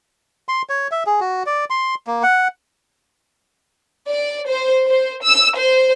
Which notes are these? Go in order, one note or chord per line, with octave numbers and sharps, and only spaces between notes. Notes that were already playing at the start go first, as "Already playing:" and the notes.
C6
C#5
E5
G#4
F#4
D5
C6
A#3
F#5
D5
C5
C5
E6
C5